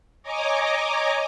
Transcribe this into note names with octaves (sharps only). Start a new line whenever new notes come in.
C#5 D#5 G#5 A#5 D6